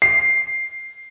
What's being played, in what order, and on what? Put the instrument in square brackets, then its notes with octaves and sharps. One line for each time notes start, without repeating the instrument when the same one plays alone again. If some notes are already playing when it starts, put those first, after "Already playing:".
[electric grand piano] C7